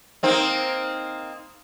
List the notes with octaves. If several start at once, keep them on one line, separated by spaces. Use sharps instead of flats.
A#3 C4 D#4